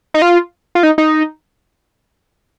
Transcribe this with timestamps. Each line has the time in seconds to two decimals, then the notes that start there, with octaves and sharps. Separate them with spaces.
0.14 D#4
0.22 F4
0.75 F4
0.83 D#4
0.98 D#4